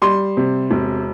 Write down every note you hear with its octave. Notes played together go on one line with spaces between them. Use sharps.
G3 C6
C3
E1